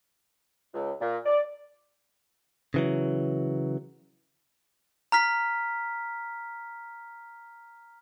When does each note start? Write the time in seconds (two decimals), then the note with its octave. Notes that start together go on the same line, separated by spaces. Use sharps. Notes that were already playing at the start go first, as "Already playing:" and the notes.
0.74 C#2
1.01 A#2
1.26 D5
2.74 C#3 E3 F#3
5.12 A#5 F6 B6